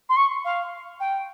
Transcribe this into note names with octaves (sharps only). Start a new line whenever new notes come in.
C6
C#6
F5
G5